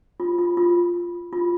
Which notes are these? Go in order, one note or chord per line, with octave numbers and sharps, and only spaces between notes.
F4
F4
F4
F4